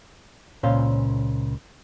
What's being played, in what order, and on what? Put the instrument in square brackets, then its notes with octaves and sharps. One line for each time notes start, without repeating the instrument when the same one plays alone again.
[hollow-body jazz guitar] C#2 A#2 C#4 C5 F5